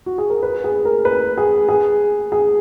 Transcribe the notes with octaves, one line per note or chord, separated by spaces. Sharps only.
F#4
G#4
A#4
B4
G#4
A#4
B4
G#4
G#4
G#4